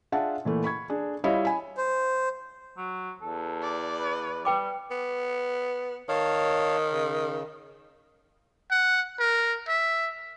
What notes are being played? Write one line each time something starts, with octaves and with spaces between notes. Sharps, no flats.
D4 F4 G#4 E5 F#5 A5
A#2 E3 A3
B5 C#6 G#6
D4 G#4
G3 E4 F4 C#5 D#5 F5
G#5 B5
C5
F#3
E2 A4
D5
B4
G3 B4 G5 D6
B3
D#3 C#5 F5 A5
C#3
F#5
A#4
E5